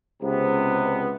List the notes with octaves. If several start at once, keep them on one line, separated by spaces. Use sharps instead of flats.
C#2 C3 B3